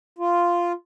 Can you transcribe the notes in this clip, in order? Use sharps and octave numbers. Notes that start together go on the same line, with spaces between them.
F4